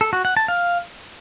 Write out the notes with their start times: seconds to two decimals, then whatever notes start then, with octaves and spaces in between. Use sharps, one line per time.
0.01 A4
0.13 F#4
0.25 F#5
0.37 A5
0.48 F5